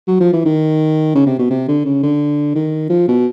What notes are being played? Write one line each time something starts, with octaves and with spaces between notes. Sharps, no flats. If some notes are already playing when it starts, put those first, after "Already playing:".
F#3
F3
E3
D#3
C#3
C3
B2
C3
D3
C#3
D3
D#3
F3
B2